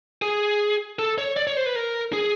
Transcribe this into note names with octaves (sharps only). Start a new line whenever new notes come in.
G#4
A4
C#5
D5
C#5
C5
B4
A#4
G#4